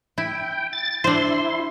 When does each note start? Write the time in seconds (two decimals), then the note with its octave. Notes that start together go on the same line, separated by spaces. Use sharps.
0.18 E4 G5
0.73 A6
1.04 D4 E4 C5 C6